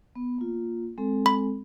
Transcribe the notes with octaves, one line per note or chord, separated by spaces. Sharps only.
B3
A#3 F4
G#3 C4 A4
B5